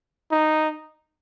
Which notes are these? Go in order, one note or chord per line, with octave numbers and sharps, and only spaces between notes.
D#4